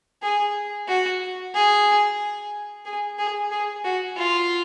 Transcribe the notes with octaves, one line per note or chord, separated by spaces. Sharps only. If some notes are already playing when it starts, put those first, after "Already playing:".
G#4
F#4
G#4
G#4
G#4
G#4
F#4
F4